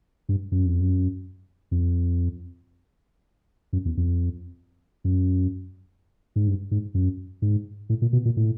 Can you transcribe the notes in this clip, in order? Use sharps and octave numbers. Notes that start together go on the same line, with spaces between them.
G2
F#2
F2
F#2
F2
F#2
E2
F2
F#2
G#2
G2
G#2
F#2
G#2
A2
A#2
B2
A#2
A2